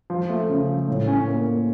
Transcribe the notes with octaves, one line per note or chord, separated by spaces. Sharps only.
F3
A3
C#3
F3
A2
C#4
A#3
A#3